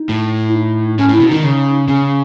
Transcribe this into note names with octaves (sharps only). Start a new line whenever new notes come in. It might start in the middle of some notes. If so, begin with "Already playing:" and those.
Already playing: D#4
A2
E4
D#4
A2 C#4
A2 E4
B2
D#3 D#4
C#3
C#3 C#4